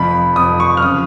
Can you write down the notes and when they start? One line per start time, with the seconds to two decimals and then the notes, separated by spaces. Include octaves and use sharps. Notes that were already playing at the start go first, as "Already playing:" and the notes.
Already playing: F1 F2 F3 B5
0.36 F1 F2 F3 D#6
0.60 C#6
0.77 F6
0.82 C#3 F3 D#6